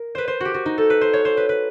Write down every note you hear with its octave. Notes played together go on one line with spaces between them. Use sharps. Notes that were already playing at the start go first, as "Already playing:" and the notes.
Already playing: A#4
B4 C5
C5
F#4 G4
F#4
D#4
A4
B4
C5
C#5
C5
B4
B4